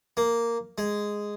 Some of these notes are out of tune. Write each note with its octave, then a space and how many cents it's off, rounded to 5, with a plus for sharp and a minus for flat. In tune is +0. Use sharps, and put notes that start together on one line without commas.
A#3 -5
G#3 -5